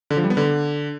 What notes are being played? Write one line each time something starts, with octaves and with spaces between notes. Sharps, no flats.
D3
F3
G3
B3
D3